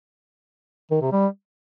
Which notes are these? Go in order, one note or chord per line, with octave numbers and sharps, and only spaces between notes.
D#3
C3
G3